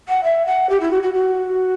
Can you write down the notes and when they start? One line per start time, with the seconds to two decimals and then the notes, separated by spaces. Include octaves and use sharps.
0.08 F#5
0.23 E5
0.46 F#5
0.69 G4
0.80 E4
0.91 F#4
1.02 F#4
1.13 F#4